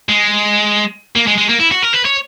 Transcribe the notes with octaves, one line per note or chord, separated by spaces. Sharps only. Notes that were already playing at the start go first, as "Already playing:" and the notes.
G#3
A#3
G#3
G#3
A#3
E4
F#4
A#4
B4
C#5